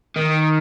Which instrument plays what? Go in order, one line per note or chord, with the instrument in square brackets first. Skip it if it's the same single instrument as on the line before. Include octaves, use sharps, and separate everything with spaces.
[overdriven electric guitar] D#3